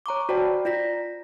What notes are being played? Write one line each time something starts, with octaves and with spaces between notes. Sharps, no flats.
C#5 A#5 C#6 D6
F#4 C5 D5 G5 A5
F4 D5 A#6 B6